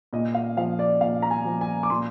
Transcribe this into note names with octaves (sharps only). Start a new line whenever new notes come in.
A#2 D#5
F5
F3 F5
D5
A#2 F5
A#5
G#5
F3
G#5
D6
A#2 C6